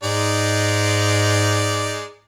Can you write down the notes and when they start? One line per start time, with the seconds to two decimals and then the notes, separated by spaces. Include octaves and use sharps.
0.03 G#2 G#3 D#4 D5